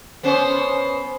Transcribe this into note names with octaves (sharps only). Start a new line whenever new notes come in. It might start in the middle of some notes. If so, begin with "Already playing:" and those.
B3 C#4 C5